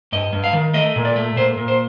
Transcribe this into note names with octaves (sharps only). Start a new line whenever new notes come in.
G2 D#5
G2
F5
D#3
A3 D#5
A#2
D5
A3
A#2 C5
A#2
C5